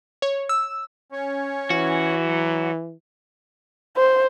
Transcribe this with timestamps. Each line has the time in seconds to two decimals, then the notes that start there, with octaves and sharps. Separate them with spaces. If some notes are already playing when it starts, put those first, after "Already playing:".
0.22 C#5
0.49 E6
1.12 C#4 C#5
1.70 E3 F#4
2.25 F#3
3.97 C5